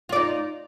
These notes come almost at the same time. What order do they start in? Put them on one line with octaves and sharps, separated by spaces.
F4 D5 D#4